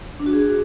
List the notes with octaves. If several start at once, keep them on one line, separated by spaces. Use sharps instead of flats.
D4
F#4
G#4